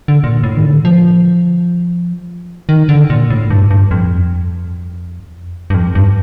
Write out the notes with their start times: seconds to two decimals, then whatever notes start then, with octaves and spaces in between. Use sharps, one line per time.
0.08 D3
0.24 A#2
0.43 A2
0.57 D#3
0.65 D3
0.85 F3
2.69 D#3
2.89 D3
3.10 A#2
3.30 A2
3.50 G2
3.71 G2
3.91 F2
5.70 G2
5.74 F2
5.95 G2